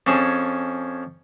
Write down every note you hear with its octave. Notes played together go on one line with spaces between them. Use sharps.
F2 C#4 G#4 A5 C#6